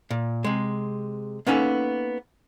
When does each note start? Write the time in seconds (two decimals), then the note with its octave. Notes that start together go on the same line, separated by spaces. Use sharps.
0.10 A#2
0.44 C3 G#3
1.47 A#3 B3 C#4 D#4 A4